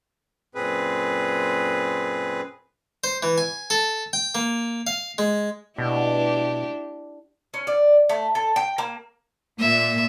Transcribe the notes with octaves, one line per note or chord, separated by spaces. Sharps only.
F#2 A#2 C4 G#4 B4
C5
E3
G#5
A4
G5
A#3
F5
G#3
B2 D4 E4 G4
C#4
D5
A3
A4
G5
A#3
A#2 E5